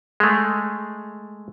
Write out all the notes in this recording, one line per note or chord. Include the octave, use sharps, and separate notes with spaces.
G#3 A3